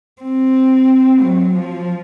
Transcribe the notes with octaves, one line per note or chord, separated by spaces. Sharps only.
C4
F#3
F3